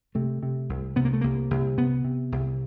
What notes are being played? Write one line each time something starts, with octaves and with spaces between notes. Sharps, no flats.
C3 A3
C3
C2
C3 B3
A#3
A3
C2 A#3
C2
C3 B3
C3
C2